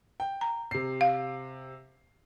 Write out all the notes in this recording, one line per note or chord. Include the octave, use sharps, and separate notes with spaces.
G5
A#5
C3 C7
F5